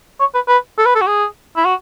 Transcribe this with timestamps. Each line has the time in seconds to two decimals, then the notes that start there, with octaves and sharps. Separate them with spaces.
0.20 C#5
0.35 B4
0.49 B4
0.78 A4
0.86 B4
0.95 A4
1.01 F#4
1.07 G#4
1.57 E4
1.65 F#4